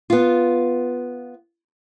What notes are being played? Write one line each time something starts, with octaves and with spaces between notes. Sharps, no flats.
B3 F4